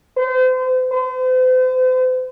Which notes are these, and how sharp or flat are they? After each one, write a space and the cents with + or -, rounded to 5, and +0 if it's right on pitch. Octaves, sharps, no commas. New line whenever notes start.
C5 -35
C5 -40